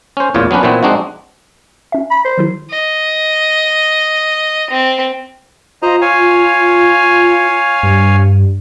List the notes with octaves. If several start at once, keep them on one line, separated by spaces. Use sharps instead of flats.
C#4 C5
A1 E2 A#2 F4 C#5
F#3 B3 C#4 D4 B4
A#2 E3 B3 C4 F#4
G#3 C4 D4 D#4 F#4
C#4 E5
B5
C5
D#3 F#3 E4
D#5
C4
F4 C5 D#5 A#5
C#5 F5 G#5
G2